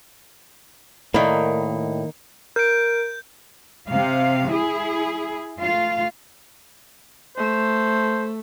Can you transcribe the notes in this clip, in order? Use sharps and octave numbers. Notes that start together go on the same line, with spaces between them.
A2 D#3 A#3 D5 D#5 B5
A#4 G6 D7
C3 F5
E4 G#4
A3 F4 F5
A3 C5